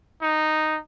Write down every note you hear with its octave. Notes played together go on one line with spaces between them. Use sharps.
D#4